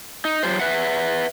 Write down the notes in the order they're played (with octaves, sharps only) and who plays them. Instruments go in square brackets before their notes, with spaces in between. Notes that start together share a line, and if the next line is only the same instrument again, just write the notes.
[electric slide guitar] D#4
F#3 F4 G4 C5
B4 E5 F#5